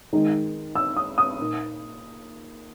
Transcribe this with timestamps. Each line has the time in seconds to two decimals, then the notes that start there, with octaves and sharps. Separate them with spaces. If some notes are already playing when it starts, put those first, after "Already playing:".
0.13 D#3 G#3 D#4
0.75 E6
0.97 D#6
1.18 D#6
1.39 A#2 A#3 D#4